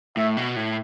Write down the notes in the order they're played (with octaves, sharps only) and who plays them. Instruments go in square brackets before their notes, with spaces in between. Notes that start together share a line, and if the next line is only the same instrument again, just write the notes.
[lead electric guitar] A2 [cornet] E5
[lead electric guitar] B2
A2